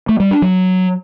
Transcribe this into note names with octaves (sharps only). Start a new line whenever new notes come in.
A3
G3
D4
F#3